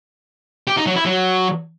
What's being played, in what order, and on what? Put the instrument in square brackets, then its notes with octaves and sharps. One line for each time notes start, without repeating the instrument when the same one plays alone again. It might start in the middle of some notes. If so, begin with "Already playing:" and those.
[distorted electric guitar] G4
D#4
F#3
E4
F#3